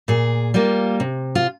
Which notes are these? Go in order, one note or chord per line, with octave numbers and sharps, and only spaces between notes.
A#2 G#4
G3 A#3 F4
C3
F4